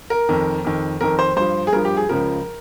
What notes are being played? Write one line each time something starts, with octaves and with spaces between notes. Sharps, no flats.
A#4
F2 D#3
F2 D#3
F2 D#3 A#4
C5
G2 F3 C5
G#4
G2 F3 A#4
G4
G#4
C#2 C#3 F3 A#4